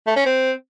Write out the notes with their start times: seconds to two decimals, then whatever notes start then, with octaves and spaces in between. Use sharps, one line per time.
0.07 A3
0.16 C#4
0.26 C4